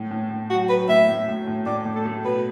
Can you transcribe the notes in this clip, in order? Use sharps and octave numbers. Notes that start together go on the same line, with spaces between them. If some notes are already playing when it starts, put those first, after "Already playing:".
Already playing: A2
A2
A2
F#3 F#4
F#3 B4
A2 E5
A2
A2
A2
A2 D5
A2
A4
A3
B2 B4